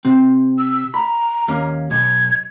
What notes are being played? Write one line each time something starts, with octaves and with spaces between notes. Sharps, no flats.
C3 C4
E6
A#5 B5
D#2 A#3 C#4
B1 G#6